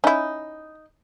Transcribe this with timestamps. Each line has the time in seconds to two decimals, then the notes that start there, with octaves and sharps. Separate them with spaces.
0.04 C#4 D#4 E4